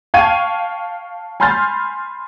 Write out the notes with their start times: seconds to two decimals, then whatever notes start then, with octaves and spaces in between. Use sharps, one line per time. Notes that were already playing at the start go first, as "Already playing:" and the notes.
0.14 F5 G5 A5 C#6 G#6 D#7
1.40 G#5 B5 C6 F6 G6 A6